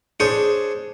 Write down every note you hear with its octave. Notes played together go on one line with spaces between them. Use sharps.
D4 G#4 C5 C#5